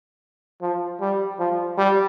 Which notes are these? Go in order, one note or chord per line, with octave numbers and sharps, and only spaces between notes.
F3
G3
F3
G3